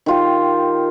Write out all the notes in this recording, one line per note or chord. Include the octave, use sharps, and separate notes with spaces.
D#3 F4 G4